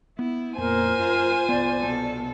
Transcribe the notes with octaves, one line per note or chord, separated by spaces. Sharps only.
B3 E4
F2 A#2 A#4 C5 G#5
F#2 F4
C2 B3 D5
B2 A4